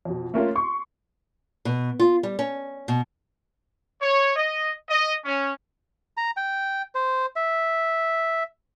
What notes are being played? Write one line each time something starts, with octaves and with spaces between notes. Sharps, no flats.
F2 B2
A3 A#3 C#4 F4
C6 C#6
B2
F4
G3
C#4
B2
C#5
D#5
D#5
C#4
A#5
G5
C5
E5